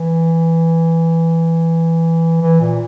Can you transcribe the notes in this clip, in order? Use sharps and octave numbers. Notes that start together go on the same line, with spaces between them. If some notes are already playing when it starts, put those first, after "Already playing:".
Already playing: E3
E3
A#2